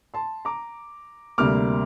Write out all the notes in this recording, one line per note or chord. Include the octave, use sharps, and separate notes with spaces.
A5 C6
A#5 D6
D2 C3 G3 A#3 D6 F6